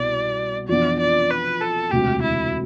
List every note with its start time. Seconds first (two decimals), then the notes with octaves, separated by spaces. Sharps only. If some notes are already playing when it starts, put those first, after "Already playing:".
Already playing: C2 B2 B3 D5
0.68 F2 E3 B3 D4 D5
1.00 D5
1.30 B4
1.61 A4
1.91 E1 D2 C3 G4
2.22 E4